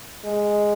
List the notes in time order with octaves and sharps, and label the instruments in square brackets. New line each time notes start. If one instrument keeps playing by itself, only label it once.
[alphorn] G#3